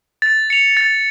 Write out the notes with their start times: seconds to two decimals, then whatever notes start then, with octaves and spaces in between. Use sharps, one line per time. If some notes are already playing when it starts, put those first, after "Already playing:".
0.22 A6
0.50 C#7 F7
0.77 A6